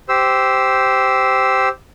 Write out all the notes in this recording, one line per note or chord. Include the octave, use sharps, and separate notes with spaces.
G4 C5 E6